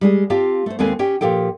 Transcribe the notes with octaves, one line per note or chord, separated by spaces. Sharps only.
G3 G#3 G#4
C4 F4 G4 F5 A5
A3 C5
D#2 G#3 C4 A4 B4 G#5
C#4 G4 G5
A#2 F3 G4 A4 G5